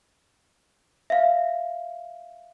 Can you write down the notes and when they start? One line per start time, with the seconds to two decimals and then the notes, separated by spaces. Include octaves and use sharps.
1.10 E5 F5